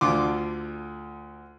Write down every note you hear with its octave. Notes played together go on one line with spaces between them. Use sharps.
D2 D3 F4 C6 D6